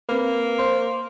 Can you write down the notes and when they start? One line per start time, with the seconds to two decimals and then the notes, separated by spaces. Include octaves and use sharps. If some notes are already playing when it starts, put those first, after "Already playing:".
0.09 A#3 C4 B4
0.59 C5 C6